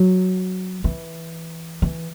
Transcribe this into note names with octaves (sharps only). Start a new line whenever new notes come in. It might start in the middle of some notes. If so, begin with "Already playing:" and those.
Already playing: F#3
E3
E3